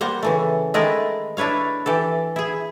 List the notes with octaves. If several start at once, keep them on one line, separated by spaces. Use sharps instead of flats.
G3 A#3 C5 F#5
C#3 E3 A3
D#3 G#3 A3 G#4 A#4 B4
D4 E4 B4 C#5 F5
E3 G4 A4
E4 G#4